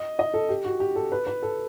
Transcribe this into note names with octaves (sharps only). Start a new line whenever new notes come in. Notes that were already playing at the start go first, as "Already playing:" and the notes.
Already playing: D#5
D#5
A4
G4
F#4
G4
A4
B4
B4
A4